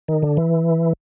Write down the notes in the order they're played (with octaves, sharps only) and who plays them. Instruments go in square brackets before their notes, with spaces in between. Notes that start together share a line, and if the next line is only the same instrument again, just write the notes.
[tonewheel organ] D#3
D3
E3